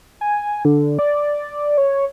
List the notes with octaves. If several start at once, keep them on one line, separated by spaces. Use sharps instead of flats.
G#5
D3
D5
C#5